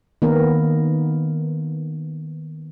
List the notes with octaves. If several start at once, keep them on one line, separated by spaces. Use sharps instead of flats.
D#3 A#3 B3 A#4